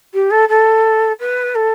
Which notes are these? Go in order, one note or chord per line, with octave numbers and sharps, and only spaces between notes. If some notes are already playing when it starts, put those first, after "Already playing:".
G4
A4
A4
B4
A4